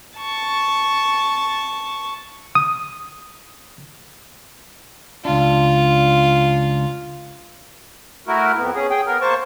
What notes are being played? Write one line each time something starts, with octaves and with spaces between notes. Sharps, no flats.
A5 C#6
D#6
C#2 D4 F4
A3 E4 F#4 A#4
F2 B3
C#4 G#4
G#4 G5
B3 A#4
A#3 C5 A5 C#6